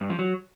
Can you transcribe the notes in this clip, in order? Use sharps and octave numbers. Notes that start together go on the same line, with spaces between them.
G2
F3
F#3